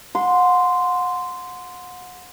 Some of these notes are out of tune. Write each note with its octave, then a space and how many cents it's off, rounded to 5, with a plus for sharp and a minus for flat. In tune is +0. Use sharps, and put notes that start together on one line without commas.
F#5 -35 C6 -10